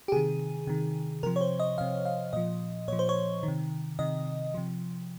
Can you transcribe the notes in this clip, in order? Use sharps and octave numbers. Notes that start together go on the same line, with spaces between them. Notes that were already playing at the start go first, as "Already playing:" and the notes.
G4
C3 D#3 G#4
C3 D#3
C3 F3 A#4
C#5
C5
D#5
C3 F3 F5
F5
A#2 F3 D#5
A#2 F3 C#5
C5
C#5
D#3
C3
C3 D#3 D#5
C3 F3